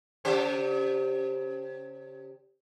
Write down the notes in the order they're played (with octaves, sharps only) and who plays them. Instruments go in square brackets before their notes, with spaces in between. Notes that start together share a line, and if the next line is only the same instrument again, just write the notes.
[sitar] C#3 G4 C5